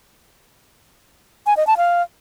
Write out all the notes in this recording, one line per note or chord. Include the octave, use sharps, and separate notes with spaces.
G#5
D#5
A5
F5